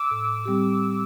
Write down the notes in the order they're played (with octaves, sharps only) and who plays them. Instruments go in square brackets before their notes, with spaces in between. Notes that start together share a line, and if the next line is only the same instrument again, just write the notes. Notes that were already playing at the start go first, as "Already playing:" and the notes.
Already playing: [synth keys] D6 E6
[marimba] A2
G3 C4 G4